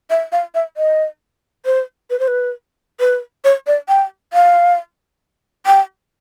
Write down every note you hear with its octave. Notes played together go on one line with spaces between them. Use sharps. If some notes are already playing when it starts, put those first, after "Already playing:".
E5
F5
E5
D#5
C5
B4
C5
B4
B4
C#5
D5
G5
F5
G5